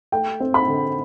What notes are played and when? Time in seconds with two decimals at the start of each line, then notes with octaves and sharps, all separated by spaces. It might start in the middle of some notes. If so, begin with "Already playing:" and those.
0.12 A3 G5
0.40 C4
0.54 B5
0.68 D3